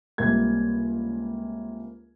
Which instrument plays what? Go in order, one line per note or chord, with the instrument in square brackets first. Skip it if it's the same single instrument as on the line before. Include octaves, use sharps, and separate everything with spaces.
[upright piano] C#2 C3 G3 A#3 G#6